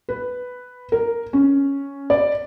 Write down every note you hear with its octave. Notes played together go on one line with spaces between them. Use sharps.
B4
A#4
C#4
D5